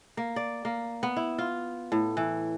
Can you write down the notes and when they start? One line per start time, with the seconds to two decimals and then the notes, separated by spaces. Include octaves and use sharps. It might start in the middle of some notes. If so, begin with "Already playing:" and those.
0.17 A#3
0.36 D5
0.65 A#3
1.03 B3
1.17 E4
1.38 F4
1.92 A2
2.17 E3